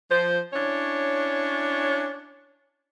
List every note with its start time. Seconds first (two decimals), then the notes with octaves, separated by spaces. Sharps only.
0.10 F3 C5
0.52 C#4 D4 E4 C#5